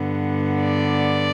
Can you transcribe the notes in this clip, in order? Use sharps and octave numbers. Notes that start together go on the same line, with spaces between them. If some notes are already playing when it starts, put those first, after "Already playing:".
Already playing: G2 D3 B3
D5